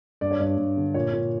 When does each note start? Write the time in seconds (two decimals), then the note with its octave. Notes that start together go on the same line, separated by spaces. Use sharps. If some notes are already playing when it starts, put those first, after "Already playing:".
0.21 G2 D5
0.31 C#5
0.40 G2 D5
0.58 G2
0.77 D3
0.94 A#2 C#5
1.13 A#2